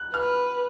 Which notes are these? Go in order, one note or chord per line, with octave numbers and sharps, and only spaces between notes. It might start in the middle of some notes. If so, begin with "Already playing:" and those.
Already playing: F#6
B4 F6